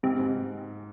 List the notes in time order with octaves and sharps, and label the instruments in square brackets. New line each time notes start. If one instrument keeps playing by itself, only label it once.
[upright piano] G#2 [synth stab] C3
[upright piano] G#2